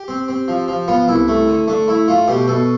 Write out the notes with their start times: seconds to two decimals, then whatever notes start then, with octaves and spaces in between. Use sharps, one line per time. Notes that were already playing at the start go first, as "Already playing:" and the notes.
Already playing: G4
0.08 C4
0.28 C4
0.48 F3
0.68 F3
0.88 B3 F4
1.08 C2 E4
1.28 A3
1.48 D3
1.68 A3 D4
1.88 A3 E4
2.08 A3 F4
2.28 B2 G4
2.48 B2 A4